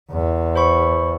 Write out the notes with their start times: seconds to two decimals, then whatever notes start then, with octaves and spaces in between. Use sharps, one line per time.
0.12 E2
0.55 C5 B5 C#6